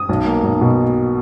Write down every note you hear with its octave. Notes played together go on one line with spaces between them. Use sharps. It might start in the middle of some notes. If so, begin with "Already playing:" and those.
Already playing: D#6
B1
A#3
B1
B2